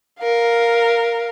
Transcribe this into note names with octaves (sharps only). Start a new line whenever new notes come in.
A#4 F5